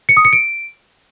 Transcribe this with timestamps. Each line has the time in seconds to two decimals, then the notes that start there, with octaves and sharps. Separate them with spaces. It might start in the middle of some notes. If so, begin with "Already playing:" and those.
0.09 C#7
0.17 D#6
0.25 C#7
0.33 D7